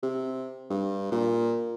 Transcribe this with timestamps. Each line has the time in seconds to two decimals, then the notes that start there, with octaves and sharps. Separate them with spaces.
0.03 C3
0.70 G2
1.12 A#2